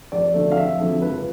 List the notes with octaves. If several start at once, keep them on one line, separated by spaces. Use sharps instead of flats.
F1 D5
F2 D3 F#3 A3
F5
F1 E5
F2 D3 F#3 A3
C#2 B4